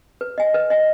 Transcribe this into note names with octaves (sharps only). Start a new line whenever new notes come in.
B4
D#5 G#5
B4
D#5 G#5